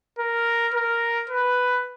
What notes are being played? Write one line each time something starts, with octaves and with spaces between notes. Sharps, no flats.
A#4
A#4
B4